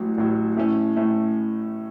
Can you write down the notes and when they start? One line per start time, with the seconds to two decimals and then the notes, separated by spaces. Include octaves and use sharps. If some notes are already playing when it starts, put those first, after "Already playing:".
Already playing: A1 A2 F#3
0.18 A1 A2 F#3
0.57 A2 A3 C#4
0.96 A2 A3 C#4